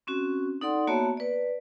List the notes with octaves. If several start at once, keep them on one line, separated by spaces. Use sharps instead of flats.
C4 C#4 F#4
D#4 A4 D5 F#5 C6
A#3 B3 F#4 C#5 E5 A5
B4 D5